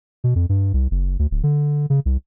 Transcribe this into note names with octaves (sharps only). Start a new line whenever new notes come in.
B2
F2
G2
C2
F#1
D2
D1
D3
C#3
C2